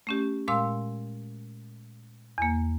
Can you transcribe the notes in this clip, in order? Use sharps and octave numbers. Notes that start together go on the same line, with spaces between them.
A3 C#4 G4
A#2 G#3 F5 C6 E6
E2 A#3